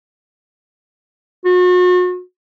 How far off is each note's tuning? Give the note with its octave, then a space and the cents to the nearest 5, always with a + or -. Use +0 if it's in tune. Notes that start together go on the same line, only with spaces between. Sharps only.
F#4 -40